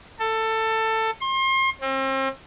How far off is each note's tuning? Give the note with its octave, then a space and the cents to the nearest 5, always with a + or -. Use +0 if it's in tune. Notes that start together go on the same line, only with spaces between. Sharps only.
A4 +15
C6 +35
C4 +40